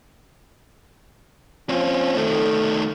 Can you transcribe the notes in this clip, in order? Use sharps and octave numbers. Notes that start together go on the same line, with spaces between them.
F3 C4 C#4
D#3 A3 A4